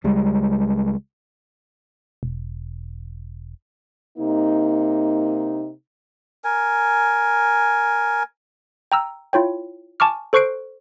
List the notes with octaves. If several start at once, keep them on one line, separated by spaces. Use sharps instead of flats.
C#2 G3 G#3
E1
C3 A#3 D#4
A#4 G#5
G5 A#5 E6 F6
E4 F4 C#5 G5
G#5 A5 C#6 D6 F6
A4 C5 C#6 F#6 C7 D7